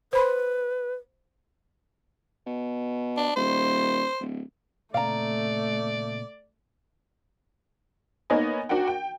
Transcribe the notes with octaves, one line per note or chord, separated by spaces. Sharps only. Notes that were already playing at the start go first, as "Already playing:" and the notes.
B4 C5 B5 C6
B2
D4
D#1 C5
D1
A#2 C#3 A3 C4 D5 F5 A#5
A#3 B3 D#4 C#5 D#5 G#5
D4 F#4 A#4 F#5 G5
G5